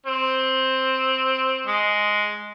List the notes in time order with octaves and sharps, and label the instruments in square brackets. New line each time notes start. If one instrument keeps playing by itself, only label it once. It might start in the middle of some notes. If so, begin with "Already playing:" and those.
[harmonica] C4
G#3